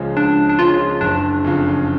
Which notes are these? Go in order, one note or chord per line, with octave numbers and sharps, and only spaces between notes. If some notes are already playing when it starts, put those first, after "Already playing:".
Already playing: C#2 C#3 F3 G#3 C#4
C#2 D4
D4
C#3 F3 G#3 C#4 F4
F#1 D4
F2 C#3